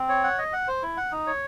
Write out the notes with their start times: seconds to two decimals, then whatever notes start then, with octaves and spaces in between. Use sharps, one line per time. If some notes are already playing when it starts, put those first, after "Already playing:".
Already playing: C4
0.09 C#5
0.24 F#5
0.38 D#5
0.53 F#5
0.68 C5
0.83 E4
0.97 F#5
1.12 D#4
1.27 C#5